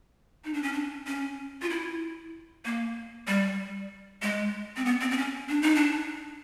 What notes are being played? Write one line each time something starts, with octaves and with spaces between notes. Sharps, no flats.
D#4
D4
C#4
D4
C#4
F4
E4
A#3
G3
G#3
C4
B3
C4
C4
C#4
D4
D#4
D4